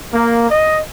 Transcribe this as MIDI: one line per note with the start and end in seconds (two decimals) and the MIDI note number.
0.14 0.51 58
0.51 0.78 75